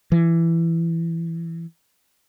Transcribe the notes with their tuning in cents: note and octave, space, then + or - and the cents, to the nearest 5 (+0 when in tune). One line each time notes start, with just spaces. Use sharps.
E3 +15